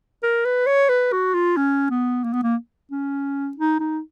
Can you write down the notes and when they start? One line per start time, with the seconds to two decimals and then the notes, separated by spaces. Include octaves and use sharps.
0.23 A#4
0.45 B4
0.67 C#5
0.89 B4
1.12 F#4
1.34 F4
1.57 C#4
1.90 B3
2.24 A#3
2.33 B3
2.43 A#3
2.91 C#4
3.57 D#4
3.80 D#4